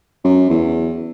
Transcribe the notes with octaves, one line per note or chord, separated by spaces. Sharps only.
F#2
E2